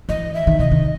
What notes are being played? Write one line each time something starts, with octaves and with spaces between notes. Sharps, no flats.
E3 D#5
E5
D#3
C3 D#5
D#3